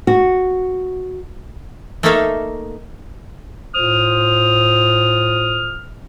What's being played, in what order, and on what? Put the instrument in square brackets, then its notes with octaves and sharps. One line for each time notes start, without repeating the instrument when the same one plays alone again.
[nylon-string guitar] F#4
[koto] A3 A#3 D#4 A4 E5 F5
[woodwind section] A2 F4 C5 D#6 F6